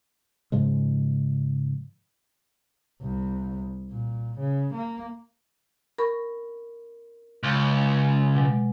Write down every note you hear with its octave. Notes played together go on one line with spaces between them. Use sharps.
G#2 C#3 F3 G#3
C2
A#2
C#3
A#3
A#4 B5 C#6
C#2
B2 F#3 G#3